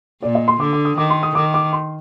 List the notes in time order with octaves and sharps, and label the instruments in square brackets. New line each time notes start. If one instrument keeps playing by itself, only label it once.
[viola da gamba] A#2 [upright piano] D5
[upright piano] D#5
C6
[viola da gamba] D3 [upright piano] D6
[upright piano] D6
D#6
[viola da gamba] D#3 [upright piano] D6
[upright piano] C6
D#6
[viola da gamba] D#3 [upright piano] D6
[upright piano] D6
C6